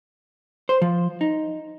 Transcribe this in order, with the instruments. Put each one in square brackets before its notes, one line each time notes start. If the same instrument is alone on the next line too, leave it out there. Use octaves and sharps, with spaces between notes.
[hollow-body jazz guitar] C5
F3
D#4